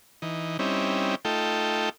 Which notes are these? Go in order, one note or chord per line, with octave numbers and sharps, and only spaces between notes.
E3 D#4
G3 C4 C#4 D#4 E4
A3 D#4 F4 A4 G5